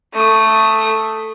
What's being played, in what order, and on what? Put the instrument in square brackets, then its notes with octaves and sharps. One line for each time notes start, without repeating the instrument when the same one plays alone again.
[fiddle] A3 D#6